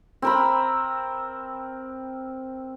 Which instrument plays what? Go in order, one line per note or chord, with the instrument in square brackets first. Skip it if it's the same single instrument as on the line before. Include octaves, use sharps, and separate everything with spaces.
[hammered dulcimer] C4 A#4 B5